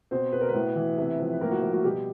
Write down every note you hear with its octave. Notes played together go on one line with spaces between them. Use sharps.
B2 C4 C5
B2 B4
A#4
B3 B4
A2
E3
C3
F3
B4
A2 A#3 A#4
F#3 F#4
F3
F#3 F#4
B2 G3 G4